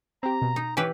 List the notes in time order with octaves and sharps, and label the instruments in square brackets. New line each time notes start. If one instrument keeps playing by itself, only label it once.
[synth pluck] C4 G4 [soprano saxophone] A#5
[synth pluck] B2
[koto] D#4
[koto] E3 G4 B4 [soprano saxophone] C#4